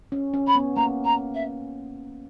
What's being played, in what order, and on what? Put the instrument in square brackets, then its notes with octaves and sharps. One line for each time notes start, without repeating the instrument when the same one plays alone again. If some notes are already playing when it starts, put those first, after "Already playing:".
[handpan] C#4
C#4
[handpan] C#4 [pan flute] B5
[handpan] B3
[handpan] A#3 [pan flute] A#5
[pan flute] A#5
E5